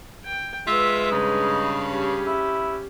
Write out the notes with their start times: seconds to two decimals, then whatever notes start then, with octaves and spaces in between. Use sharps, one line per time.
0.25 G5
0.67 G#3 F4 B4 E5
1.11 G2 C#3 D#4
1.89 C#4 G4
2.26 E4